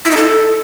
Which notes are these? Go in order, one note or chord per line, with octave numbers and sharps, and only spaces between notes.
E4
D#4
A4